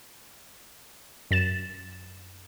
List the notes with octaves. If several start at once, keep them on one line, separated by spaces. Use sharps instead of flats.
F#2 A6 E7